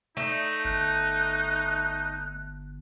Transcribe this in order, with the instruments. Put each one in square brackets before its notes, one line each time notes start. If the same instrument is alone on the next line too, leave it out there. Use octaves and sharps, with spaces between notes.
[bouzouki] A3 [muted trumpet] D#4
[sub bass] G1 [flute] F#6